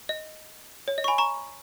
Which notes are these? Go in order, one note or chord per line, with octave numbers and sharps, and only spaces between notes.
D#5
C#5
D#5
C#6
G#5 B5
A#5 C#6